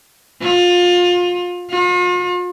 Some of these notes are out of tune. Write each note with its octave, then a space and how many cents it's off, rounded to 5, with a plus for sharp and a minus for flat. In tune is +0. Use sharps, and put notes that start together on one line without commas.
F4 +25
F4 +45